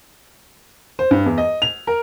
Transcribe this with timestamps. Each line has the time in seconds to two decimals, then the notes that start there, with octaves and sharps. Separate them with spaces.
0.99 C5
1.11 G2
1.26 E2
1.38 D#5
1.62 F7
1.87 A#4